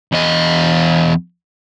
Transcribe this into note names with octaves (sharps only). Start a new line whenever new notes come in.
E2 D#5